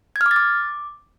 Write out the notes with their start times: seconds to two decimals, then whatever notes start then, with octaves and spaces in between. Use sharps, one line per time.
0.16 G#6
0.21 F6
0.26 D6
0.31 A6
0.36 D6